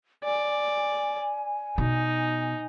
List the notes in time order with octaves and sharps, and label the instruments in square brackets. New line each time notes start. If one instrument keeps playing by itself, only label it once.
[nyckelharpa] D5 [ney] G#5
[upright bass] B2 [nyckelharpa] D#4